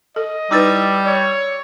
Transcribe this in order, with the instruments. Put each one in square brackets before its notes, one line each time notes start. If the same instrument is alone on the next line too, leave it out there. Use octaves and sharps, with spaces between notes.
[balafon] A4 [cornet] D#5
[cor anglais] G3 [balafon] D#4 E4 B4 [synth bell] D6 E6 A6
[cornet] C#5 [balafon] D5